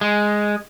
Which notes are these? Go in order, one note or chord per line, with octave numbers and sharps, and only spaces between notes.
G#3